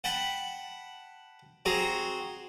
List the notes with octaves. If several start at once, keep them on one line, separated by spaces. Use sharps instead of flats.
F#5 G5 A5 B5
C4 F#4 G#4 A#5